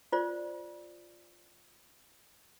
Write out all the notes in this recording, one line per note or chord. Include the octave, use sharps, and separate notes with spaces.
F4 C5 D5